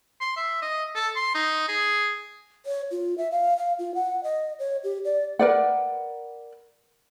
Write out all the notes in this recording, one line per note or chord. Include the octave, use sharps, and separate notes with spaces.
C6
E5
D#5
A4
C6
D#4
G#4
C#5
F4
E5
F5
F5
F4
F#5
D#5
C#5
G4
D5
A#4 B4 D5 F#5